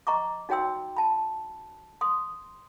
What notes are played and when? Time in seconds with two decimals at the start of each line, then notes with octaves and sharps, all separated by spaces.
0.07 D#5 A#5 C#6 D6
0.49 D#4 F#4 C#5 G5 C6 E6
0.96 A5 B5
2.01 C6 D#6